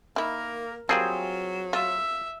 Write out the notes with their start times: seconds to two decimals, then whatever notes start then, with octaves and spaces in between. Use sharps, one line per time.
0.16 D#3 A#3 E4 A#4
0.89 F#3 G3 A#3 C4 D4 F4 G#4
1.73 F4 E5